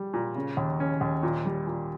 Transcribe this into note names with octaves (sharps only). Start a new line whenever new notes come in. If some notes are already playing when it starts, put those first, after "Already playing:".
Already playing: G3
A#2
C#3
D#2
C#4
D#2
A#2
G3
A#2